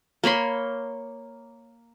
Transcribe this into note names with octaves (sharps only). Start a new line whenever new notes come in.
A#3 C#5 B5 C6